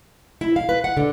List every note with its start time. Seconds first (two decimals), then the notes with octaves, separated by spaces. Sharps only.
0.41 E4
0.56 F5
0.69 B4
0.84 F#5
0.97 D3